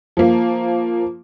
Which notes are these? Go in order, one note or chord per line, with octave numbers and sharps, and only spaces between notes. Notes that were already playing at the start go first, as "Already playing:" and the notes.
F3 A#3